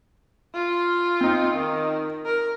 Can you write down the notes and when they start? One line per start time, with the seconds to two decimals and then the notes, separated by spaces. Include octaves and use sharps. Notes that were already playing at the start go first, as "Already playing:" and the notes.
0.54 F4
1.21 C4 D#4
1.54 D#3
2.25 A#4